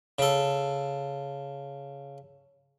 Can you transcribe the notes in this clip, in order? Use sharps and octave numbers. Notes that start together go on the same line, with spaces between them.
C#3 A4